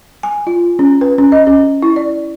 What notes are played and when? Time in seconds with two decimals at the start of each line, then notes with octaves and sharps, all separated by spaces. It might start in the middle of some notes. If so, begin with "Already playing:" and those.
0.23 G#5
0.47 F4
0.79 C#4
1.01 B4
1.18 C#4
1.32 D#5
1.47 C#4
1.83 E4
1.96 D5